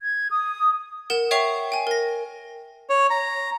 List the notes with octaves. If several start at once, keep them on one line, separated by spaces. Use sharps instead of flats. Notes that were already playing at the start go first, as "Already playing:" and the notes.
G#6
D#6
A#4 F#5 E7
C#5 E5 G5 C#6 C7 F7
G5 G#5
A#4 A#6
C#5
A#5